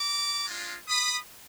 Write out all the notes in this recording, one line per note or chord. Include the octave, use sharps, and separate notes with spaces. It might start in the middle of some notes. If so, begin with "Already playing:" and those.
Already playing: A#5 D6
G#3 D4 F4
B5 D#6